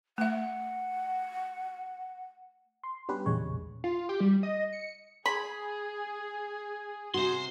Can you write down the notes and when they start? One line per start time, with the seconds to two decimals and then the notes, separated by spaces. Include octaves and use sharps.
0.18 A3 E5 F#5
2.84 C6
3.09 G3 B3 C#4 D4 G4 B4
3.26 A#1 E2 C#3 G#3 C#5
3.84 F4
4.09 G4
4.20 G3
4.43 D#5
4.73 C#7
5.26 G#4 B5
7.14 C3 F#4 C5 C6